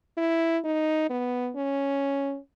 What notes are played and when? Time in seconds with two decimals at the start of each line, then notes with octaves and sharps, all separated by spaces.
0.18 E4
0.64 D#4
1.10 B3
1.56 C#4